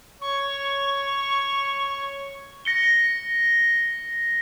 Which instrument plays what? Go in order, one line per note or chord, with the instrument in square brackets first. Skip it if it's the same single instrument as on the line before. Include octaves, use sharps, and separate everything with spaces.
[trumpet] C#5 [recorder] C#6
[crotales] A#6 C#7 G7